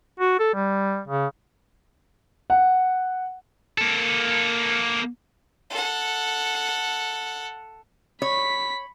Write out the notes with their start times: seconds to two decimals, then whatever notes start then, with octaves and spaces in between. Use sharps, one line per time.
0.20 F#4
0.40 A4
0.54 G3
1.08 C#3
2.50 F#5
3.78 A#3 A4
5.71 A4 F#5
8.22 C#5 B5 B6